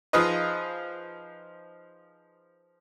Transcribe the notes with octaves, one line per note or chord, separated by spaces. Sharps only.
F3 D#4 F4 G#4 B4 D#5